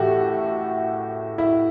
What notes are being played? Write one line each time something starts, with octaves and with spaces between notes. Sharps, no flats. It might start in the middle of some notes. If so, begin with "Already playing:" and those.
Already playing: A2 E3 F#4 G4 A4
E4